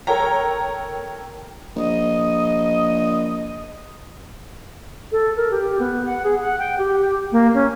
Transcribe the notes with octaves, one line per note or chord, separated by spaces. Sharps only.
A4 A#4 C#5 G5 A#5
A#1 D#5
A4
A#4
G4
B3
F#5
G#4
F#5
G5
G4
A#3
C#4